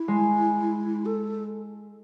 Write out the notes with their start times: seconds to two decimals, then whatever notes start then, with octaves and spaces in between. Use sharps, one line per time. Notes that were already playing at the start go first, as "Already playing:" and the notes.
Already playing: E4
0.08 G#3
1.06 A4